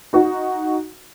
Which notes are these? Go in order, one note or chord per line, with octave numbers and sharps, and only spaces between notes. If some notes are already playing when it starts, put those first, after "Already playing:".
D#4 F#4